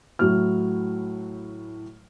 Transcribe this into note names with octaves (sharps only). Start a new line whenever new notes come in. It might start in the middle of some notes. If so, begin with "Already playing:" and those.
A2 F#3 E4 F6